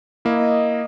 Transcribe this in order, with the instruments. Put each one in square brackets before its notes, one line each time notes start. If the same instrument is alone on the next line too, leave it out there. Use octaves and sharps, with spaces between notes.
[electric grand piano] A#3 E4 [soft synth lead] D#5